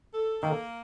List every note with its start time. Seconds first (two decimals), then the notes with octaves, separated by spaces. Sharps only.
0.14 A4
0.43 D#3 A#3